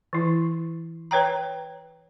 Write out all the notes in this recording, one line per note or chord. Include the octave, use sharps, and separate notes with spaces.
E3 E4
B4 C#5 G5 A#5